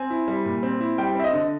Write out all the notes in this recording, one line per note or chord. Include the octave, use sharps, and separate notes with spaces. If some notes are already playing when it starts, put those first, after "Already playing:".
Already playing: C4 G#5
E4
G3
A#2
C4
E4
G3 G5
C4 E5
D#5
D3